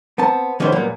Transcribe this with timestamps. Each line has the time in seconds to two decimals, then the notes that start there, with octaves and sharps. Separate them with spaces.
0.18 B3 C4 A5
0.60 D#3 E3 A3 B3 C#4 C5
0.72 F#2 A#2 F#3 G3 A#3 B3